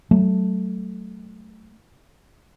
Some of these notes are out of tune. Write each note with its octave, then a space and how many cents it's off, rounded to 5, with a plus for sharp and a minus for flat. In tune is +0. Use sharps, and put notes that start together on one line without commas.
F#3 +30 A3 +0